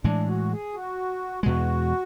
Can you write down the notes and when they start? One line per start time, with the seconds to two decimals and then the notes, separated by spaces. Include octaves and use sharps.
0.04 A2 E3 G#3 D4
0.28 F#4
0.51 G#4
0.74 F#4
1.43 E2 B2 G#3 F#4